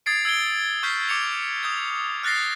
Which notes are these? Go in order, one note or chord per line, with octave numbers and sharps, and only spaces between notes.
D#6 G#6 A6 C7 D7
E6 G#6 D7 G7
C#6 F6 G6 B6 C7
D6 C#7 F7
D#6 G6 G#6
F6 F#6 A6 A#6 C7